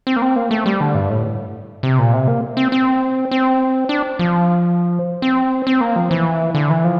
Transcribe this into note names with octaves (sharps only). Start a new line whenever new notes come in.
C4
A#3
C4
A#3
A3
G3
D3
G2
A2
C3
A#2
C3
A#3
C4
C4
C4
D4
F3
C4
C4
A#3
F3
E3
D3
E3
F3